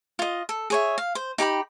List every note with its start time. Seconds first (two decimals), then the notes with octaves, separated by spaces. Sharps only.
0.19 F4 D#5
0.49 A4
0.70 G#4 C#5 E5
0.98 F5
1.15 C5
1.38 D#4 G4 G5 B5